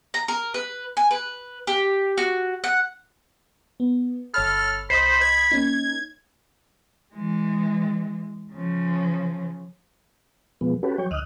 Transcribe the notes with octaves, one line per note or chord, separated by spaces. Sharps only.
A#5
A#4
B4
G#5
B4
G4
F#4
F#5
B3
G1 A4 C#5 B5 F6
C2 C5 D#5 B5 D#6
G#6
A#3 C#4 D#4
E3 G#3
C#3 F3
B2 F3 G#3 B3
C#4 F#4 G4 A4 B4
F#3 C#5 G5
D2 D#5 D#6 F6 F#6